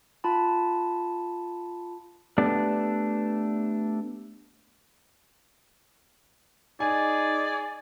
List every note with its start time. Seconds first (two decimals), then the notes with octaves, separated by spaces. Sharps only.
0.24 F4 A5 B5
2.38 A3 B3 D4 G4 B4 D5
6.80 D#4 G#4 D5 G#5